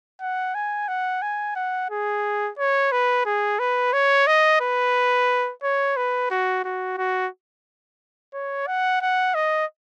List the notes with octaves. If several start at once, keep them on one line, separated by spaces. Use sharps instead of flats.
F#5
G#5
F#5
G#5
F#5
G#4
C#5
B4
G#4
B4
C#5
D#5
B4
C#5
B4
F#4
F#4
F#4
C#5
F#5
F#5
D#5